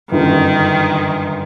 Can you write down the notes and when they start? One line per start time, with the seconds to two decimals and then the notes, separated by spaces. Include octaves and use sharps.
0.11 G1 F#2 D3 D#3